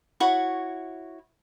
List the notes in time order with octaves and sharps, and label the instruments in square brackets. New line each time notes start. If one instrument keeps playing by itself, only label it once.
[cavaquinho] E4 F#4 C#5